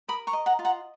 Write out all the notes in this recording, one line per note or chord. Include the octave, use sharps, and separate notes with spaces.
A#4 B5 D#6
A#5 C#6
D#5
F#5 A#5
F4
F#5 A#5